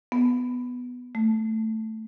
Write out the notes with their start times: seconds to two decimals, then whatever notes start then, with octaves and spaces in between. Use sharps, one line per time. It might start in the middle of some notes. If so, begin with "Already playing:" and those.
0.12 B3
1.15 A3